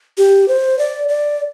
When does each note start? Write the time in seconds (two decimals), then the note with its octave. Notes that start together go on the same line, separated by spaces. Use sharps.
0.18 G4
0.48 C5
0.79 D5
1.09 D5